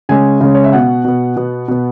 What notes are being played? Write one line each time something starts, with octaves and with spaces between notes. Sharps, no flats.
C#3 G#3 C#4 G#5
C#3 G#3 C#4
C#5
E5
B2 B3 F#5
B2 B3
B2 B3
B2 B3